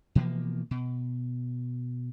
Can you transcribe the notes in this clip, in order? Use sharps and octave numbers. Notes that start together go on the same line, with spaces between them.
B2 E3 F3 A#3
B2